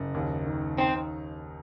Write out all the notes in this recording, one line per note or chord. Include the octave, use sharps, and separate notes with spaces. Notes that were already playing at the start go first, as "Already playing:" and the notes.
Already playing: F#1
D#2
D#3
C4 D#4